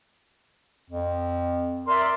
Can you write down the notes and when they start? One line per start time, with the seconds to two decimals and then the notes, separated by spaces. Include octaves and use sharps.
0.90 F2
1.87 A#4 D5 E5 C6